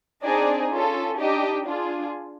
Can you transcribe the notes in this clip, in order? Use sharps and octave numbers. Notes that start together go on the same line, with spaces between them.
C4 D4 D#4 G#4 D5
C#4 F4 A4
D4 D#4 G4 D#5
D4 F4 G#4